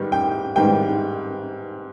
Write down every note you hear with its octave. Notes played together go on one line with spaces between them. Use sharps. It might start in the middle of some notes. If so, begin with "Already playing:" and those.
Already playing: G#2 D#3 G3 B3
G5
G#2 D#3 G3 B3 G5